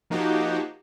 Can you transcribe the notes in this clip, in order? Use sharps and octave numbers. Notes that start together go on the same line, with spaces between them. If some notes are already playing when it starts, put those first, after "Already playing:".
F3 A#3 D#4 F#4 G4